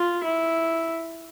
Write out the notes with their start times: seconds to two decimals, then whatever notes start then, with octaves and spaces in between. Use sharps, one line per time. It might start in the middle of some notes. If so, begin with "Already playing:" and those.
Already playing: F4
0.25 E4